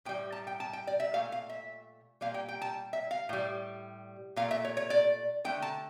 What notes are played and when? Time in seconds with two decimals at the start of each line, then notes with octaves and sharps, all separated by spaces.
0.05 A2 G5
0.09 G3
0.32 A5
0.47 G5
0.60 A5
0.73 G5
0.87 D5
1.00 E5
1.13 A#2 A3 F5
1.32 F5
1.49 E5
2.21 A#2 G3 F5
2.34 G5
2.49 G5
2.62 A5
2.93 E5
3.11 F5
3.29 A2 G3
4.36 A#2 A3 F5
4.51 E5
4.65 C#5
4.77 C#5
4.90 D5
5.45 D3 A3 G5
5.62 A5